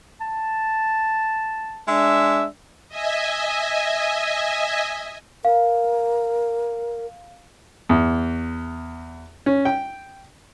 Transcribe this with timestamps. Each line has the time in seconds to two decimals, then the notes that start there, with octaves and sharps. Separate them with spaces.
0.21 A5
1.88 G#3 D4 E5
2.88 D#5 E5 G#5
5.45 A#4 F5
7.89 E2
9.46 C#4
9.65 G5